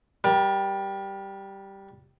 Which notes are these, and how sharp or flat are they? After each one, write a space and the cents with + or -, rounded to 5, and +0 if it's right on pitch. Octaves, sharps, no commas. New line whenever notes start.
G3 -5 A#4 +35